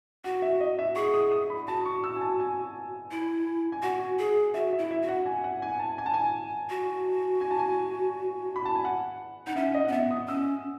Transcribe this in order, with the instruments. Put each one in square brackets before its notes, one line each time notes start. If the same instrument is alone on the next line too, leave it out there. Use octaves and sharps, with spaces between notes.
[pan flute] F#4 [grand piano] F#5
[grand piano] E5
D#5
E5
[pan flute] G#4 [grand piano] C#6
[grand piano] D#6
D#6
B5
[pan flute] F#4 [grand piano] A5
[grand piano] C#6
E6
G#5
A5
G#5
[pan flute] E4
[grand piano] G#5
[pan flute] F#4 [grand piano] F#5
[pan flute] G#4
[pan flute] F#4 [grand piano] E5
[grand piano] E5
[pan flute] E4
[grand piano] E5
[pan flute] F#4
[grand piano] F#5
G#5
F#5
G#5
A5
G#5
A5
G#5
[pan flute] F#4
[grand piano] G#5
A5
G#5
B5
A5
G#5
F#5
[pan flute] D#4 [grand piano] F#5
[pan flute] C#4 [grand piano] E5
[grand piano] D#5
F#5
[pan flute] C#4
[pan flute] B3 [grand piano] E5
[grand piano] D#6
[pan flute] C#4 [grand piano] E6